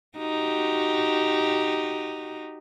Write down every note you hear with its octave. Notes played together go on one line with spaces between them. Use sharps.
D#4 F#4 G4